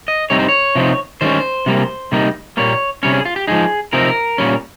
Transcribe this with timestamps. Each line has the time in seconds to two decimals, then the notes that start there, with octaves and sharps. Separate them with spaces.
0.08 D#5
0.30 C3 G3 C4 D#4 C#5
0.39 C5
0.49 C#5
0.75 C3 F3 C4 D#4
1.21 D#3 G3 C#4 C5
1.66 C3 G3 A#3
2.12 C3 G3 A#3 D#4
2.57 A#2 G3 A#3 C#5
3.03 C3 G3 C#4 C#5
3.14 G#4
3.25 F4
3.36 G4
3.47 F3 G#3 D#4 G#4
3.93 C3 F3 C4 D#4 A#4
4.38 A#2 G3 C#4